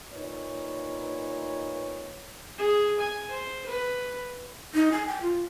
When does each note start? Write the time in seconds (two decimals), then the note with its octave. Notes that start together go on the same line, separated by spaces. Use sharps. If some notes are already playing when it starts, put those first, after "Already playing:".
0.13 A#2 D#4 B4 C#5
2.58 G#4
3.00 G#5
3.31 C5
3.66 B4
4.74 D#4
4.92 G#5
5.07 G5
5.21 F4